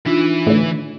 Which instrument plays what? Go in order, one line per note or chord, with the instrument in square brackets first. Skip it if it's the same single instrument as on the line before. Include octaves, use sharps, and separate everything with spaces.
[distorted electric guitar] E3 E5 [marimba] D4 D#4 F4
[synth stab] A2 D3